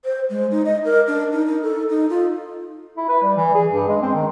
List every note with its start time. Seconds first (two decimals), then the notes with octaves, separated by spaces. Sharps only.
0.05 C5
0.30 G#3
0.51 D#4
0.65 D#5
0.85 A#4
1.07 D4
1.32 D#4
1.46 D#4
1.63 A4
1.89 D#4
2.10 F4
2.97 E4
3.09 B4
3.22 G3
3.36 E3
3.55 G#4
3.73 G2
3.88 G#3
4.02 C4
4.14 D#3